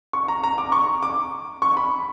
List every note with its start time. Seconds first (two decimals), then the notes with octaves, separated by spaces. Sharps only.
0.13 C#6
0.28 A#5
0.44 A#5
0.58 D6
0.72 C#6
1.03 D6
1.62 C#6
1.77 B5